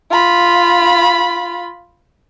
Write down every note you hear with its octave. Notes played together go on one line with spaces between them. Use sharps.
F4 B5